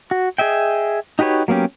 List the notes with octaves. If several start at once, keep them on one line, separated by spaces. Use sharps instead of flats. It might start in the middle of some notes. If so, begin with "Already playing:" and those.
F#4
G#4 D#5 E5 G5
D#4 F#4 G4 B4 C#5
F#3 A#3 B3 C#4 G4